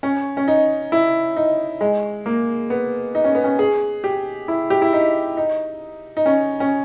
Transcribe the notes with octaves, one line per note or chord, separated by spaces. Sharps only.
C#4
C#4
D#4
E4
D#4
G#3
A#3
B3
D#4
C#4
B3
C#4
G#4
G4
E4
G4
E4
D#4
D#4
D#4
C#4
C#4